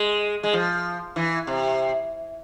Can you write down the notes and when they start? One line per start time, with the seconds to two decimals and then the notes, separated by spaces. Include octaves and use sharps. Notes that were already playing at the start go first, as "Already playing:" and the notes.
Already playing: G#3
0.43 G#3
0.53 F3
1.16 E3
1.47 C3